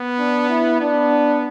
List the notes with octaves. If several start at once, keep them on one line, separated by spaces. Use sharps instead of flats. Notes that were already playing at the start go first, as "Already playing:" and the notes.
Already playing: B3
D4
E4
B3 D4